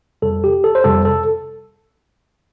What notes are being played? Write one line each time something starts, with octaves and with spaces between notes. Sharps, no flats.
F2 C3 G3 A4
G4
A4
C5
F2 C3 G3 A4
A4